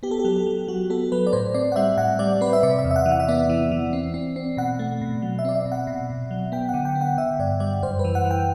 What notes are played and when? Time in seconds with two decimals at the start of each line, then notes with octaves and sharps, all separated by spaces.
0.03 B3 G4
0.11 A4
0.19 G4
0.25 F#3 A4
0.37 G4
0.47 F#3
0.68 F#3 F#4
0.90 B3 A4
1.12 F#3 B4
1.27 D5
1.33 A2 C5
1.54 C4 D5
1.72 F#5
1.76 G3 E5
1.97 A2 F#5
2.19 G3 D5
2.41 C4 B4
2.53 E5
2.63 C3 D5
2.79 E5
2.85 E2
2.91 E5
2.96 F#5
3.06 E3
3.12 F#5
3.20 E5
3.28 B3 D5
3.49 E3
3.71 E3
3.93 C4
4.14 C4
4.36 C4
4.57 B2 F#5
4.79 A3
5.01 B2
5.22 F#3
5.39 E5
5.45 C4 D5
5.55 E5
5.65 B2
5.72 F#5
5.87 B2
6.10 B2
6.31 F#3
6.52 B3 G5
6.69 D3 F#5
6.85 G5
6.95 B3
7.01 F#5
7.18 D3 E5
7.39 G2 D5
7.60 G3 D5
7.83 F#2 C5
7.99 B4
8.04 E3
8.15 F#5
8.25 E3
8.31 G5